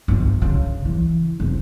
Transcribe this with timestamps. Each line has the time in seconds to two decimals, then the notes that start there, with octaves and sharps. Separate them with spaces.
0.08 G1 D2
0.42 C#3
0.85 E3
1.40 F1